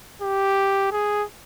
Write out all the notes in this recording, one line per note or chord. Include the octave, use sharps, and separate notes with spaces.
G4
G#4